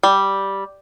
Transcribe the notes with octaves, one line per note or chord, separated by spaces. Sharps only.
G3